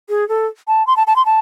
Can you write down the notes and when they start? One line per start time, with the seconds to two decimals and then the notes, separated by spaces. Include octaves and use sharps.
0.09 G#4
0.28 A4
0.68 A5
0.87 C6
0.97 A5
1.07 A5
1.16 C6
1.26 A5